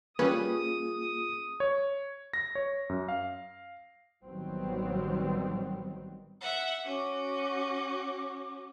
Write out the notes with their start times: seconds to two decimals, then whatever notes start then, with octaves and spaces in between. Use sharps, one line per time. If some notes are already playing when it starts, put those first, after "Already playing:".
0.19 G3 A#3 C#4 F4 G#4 B4 D#6
1.60 C#5
2.34 A#6
2.55 C#5
2.89 F#2
3.08 F5
4.24 A1 D#3 F#3 G3 B3 C4
6.41 E5 F#5
6.85 C#4 F#4 D6